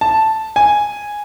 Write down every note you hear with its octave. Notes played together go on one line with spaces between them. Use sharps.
A5
G#5